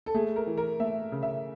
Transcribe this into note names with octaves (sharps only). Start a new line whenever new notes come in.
A4
A3 G#4
A#4
E3
A#4
A3 E5
C#3
E5